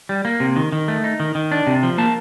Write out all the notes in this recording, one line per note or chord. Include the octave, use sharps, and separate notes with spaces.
G3
A#3
C3
D#3
D#3
A3
D#4
D#3
D#3
D4
C3
F3
A#3 A5